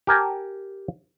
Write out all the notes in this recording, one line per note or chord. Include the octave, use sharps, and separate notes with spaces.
G4 A#4 G#5 A5